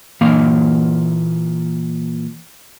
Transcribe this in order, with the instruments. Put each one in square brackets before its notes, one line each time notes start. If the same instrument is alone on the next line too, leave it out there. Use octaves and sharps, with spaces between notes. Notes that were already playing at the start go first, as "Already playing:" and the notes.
[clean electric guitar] A#2 E3 A#3 F5